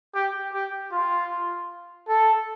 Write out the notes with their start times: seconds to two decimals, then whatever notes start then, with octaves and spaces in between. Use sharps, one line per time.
0.15 G4
0.53 G4
0.92 F4
2.09 A4